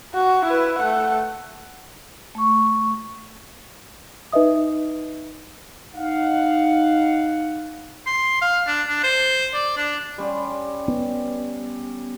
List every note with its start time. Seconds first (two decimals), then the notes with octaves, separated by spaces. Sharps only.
0.14 F#4
0.45 E4 B4
0.78 A3 F#5
2.35 A3 C#6
4.32 D#4 B4 D#5 E5 D#6
5.96 D#4 F5 F#5
8.06 C6
8.42 F5
8.67 D4
8.88 D4
9.03 C5
9.54 D5
9.77 D4
10.18 G3 C#4 C6
10.88 B3